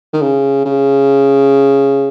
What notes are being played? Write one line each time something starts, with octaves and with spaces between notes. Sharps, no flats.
D#3
C#3
C#3